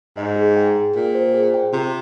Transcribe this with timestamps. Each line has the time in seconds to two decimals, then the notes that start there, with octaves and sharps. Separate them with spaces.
0.17 G#2 D#5
0.36 G#4
0.57 G5
0.76 G#4
0.95 A#2 G5
1.15 C5
1.34 G#4
1.54 G5
1.73 C3 F4